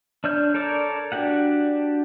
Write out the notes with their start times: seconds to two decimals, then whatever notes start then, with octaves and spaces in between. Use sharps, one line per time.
0.24 D4 C#5 F6 G6
0.54 A4 A#4 C#5 D5
1.12 D4 F#4 G4 F#5